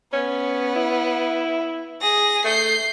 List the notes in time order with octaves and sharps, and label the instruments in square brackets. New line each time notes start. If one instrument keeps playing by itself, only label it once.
[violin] B3 [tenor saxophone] C#4
[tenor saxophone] E4
[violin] G#4 A#6
[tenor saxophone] A3 [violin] G6 C7